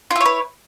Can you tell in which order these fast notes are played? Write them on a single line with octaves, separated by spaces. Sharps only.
F4 E4 C#5 B4